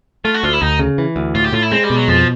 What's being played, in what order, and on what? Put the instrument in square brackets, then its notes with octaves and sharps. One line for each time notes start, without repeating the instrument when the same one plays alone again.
[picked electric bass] A3 [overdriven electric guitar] F4
[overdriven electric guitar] F#4
[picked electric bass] D2 [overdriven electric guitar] F4
[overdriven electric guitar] E4
[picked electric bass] D2 [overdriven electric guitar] D#4
[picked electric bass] C#3
E3
D2
[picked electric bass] A2 [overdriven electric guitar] F4
[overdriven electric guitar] G4
[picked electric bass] A2 [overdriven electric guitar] F4
[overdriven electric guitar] E4
[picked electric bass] G#3 [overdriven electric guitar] C4
[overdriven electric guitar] G3
[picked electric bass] B2
[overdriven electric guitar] F#3
[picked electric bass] F2 [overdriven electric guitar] F3